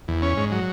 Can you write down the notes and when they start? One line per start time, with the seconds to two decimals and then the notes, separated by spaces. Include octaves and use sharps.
0.08 E2
0.22 C#4
0.37 G#2
0.52 F#3